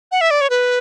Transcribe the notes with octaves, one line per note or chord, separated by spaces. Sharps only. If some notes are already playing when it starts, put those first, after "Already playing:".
F#5
E5
D5
C#5
B4